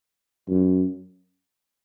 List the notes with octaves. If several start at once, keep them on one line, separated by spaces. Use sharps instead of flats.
F#2